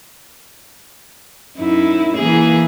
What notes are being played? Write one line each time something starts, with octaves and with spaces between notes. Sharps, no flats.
F#2 D#4 E4
E3 A#3 G#4